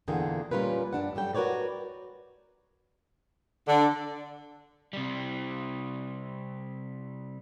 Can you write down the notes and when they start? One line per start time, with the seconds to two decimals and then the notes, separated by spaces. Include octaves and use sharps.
0.08 E2 A#2 D3 A#3 G#4 G5
0.51 A#2 G3 C#4 F4 A#4 B4
0.93 G2 E3 D4 F#5
1.15 F#2 G3 A4 G5
1.35 F#4 A#4 B4 C#5 D5
3.68 D3
4.93 C3 G3